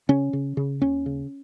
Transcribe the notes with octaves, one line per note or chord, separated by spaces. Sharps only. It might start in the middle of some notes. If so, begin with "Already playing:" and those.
C#3 C#4
C#3
C#3
D#2 C#4
C#3